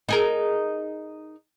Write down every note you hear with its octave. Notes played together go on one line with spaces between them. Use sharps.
D#4 G#4 A#4